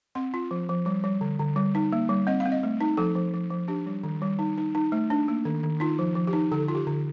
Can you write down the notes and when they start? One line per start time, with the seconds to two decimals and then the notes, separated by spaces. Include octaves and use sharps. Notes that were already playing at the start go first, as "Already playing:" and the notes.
0.15 C4 C6
0.34 F4
0.51 F3
0.69 F3
0.86 G3
1.04 G3
1.21 D3
1.39 D3
1.56 G3
1.75 D#4
1.92 A#3
2.09 G3
2.27 C4 D#5
2.40 F5
2.46 C4
2.52 D#5
2.63 A3
2.81 D#4
2.97 F3 A4
3.16 F3
3.34 F3
3.50 F3
3.68 D4 G4
3.86 G3
4.03 D#3
4.22 G3
4.39 D#4
4.58 D#4
4.75 D#4
4.92 A3
5.10 D4
5.28 A#3
5.45 D#3
5.63 D#3
5.80 D#4 F4
5.99 F3
6.15 F3
6.27 G4
6.33 D#4
6.51 D3 A4
6.68 F4
6.75 G4
6.87 D3